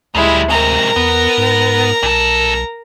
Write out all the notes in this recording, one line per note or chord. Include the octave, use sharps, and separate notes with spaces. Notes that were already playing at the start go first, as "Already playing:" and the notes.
D2 A#2 G3 G#3 E4
G#2 C3 A#4 A#5
E2 B3
G#2
B1 A#2 A4